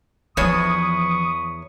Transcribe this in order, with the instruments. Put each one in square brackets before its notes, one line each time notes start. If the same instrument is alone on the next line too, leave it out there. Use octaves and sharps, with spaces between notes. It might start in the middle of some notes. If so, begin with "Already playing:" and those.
[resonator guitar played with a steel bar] E2 C#5 [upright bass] E3 F3 [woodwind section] B5 C#6 D#6